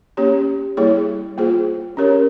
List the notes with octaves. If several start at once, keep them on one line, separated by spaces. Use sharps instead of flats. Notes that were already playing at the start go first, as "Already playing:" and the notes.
A#3 C#4 G4 C#5
G3 A#3 E4 G#4 C#5
A#3 F4 G#4 C5
C#4 G4 A#4 C#5